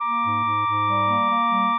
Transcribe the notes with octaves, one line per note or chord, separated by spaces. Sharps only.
A#3 A#5 D6
G#2
G#2
G#2
G3
A#3
A#3
G3